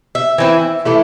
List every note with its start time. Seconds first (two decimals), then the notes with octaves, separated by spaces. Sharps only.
0.15 E5
0.38 E3 C4 E4
0.85 E3 A3 E4